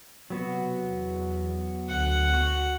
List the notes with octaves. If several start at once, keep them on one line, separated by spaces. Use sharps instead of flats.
C3 F#3 B3 F#4
E2
D2 F#5
F#4